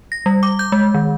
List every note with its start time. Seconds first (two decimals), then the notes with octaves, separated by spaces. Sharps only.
0.12 A#6
0.26 G3
0.43 D6
0.59 G6
0.72 G#3
0.94 D#3